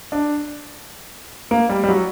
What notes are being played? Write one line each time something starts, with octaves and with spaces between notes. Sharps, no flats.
D4
A#3
G3
G3
F#3